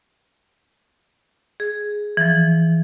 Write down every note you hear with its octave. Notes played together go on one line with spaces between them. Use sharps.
G#4
E3 F3